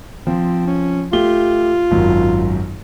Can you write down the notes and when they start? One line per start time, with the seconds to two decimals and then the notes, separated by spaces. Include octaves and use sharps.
0.27 F3 C4
0.67 C#4
1.13 A3 F4 G4 G7
1.91 G#1 F#2